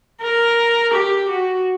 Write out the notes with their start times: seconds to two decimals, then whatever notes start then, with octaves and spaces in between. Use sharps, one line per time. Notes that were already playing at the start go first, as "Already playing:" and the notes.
0.22 A#4
0.93 G4
1.29 F#4